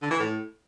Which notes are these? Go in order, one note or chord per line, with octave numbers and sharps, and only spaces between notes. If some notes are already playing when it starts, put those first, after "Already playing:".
D3
E3
A2